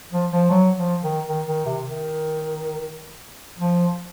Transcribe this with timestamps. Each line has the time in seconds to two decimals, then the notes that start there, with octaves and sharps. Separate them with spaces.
0.12 F3
0.32 F3
0.51 F#3
0.76 F3
1.02 D#3
1.28 D#3
1.47 D#3
1.66 C3
1.85 D#3
3.59 F3